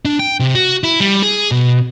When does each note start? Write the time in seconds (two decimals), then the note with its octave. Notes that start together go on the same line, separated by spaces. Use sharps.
0.05 D4
0.19 G5
0.40 C3
0.55 F#4
0.83 E4
1.00 G3
1.23 G#4
1.51 B2